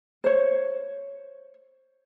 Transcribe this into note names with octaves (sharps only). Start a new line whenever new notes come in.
C5 C#5